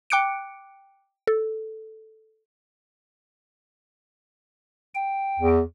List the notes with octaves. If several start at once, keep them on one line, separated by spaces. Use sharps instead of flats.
G5 D6 F#6 C#7 D7
A4
G5
E2